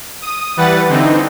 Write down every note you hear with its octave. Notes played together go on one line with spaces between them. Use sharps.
D#6
E3 G3 B4 F#5 A6
D3 E3 C4 D#4